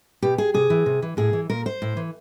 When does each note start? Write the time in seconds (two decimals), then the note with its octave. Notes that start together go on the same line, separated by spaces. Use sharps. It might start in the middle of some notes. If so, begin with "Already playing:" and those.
0.22 B2 G4
0.38 G#4
0.54 C3 G#4
0.70 E3
0.86 C3
1.02 E3
1.17 A2 G#4
1.33 E3
1.50 A#2 A#4
1.66 C5
1.82 A2
1.97 E3